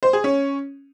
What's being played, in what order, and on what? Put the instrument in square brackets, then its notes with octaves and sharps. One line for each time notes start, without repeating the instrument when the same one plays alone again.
[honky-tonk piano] C5
G#4
C#4